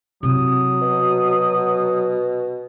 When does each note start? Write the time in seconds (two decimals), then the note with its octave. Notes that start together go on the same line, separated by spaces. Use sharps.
0.23 C3 F#3 E4 D#6
0.81 B2